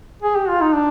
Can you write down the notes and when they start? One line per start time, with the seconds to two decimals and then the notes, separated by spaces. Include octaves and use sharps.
0.22 G#4
0.36 G4
0.49 F4
0.61 D#4
0.73 D4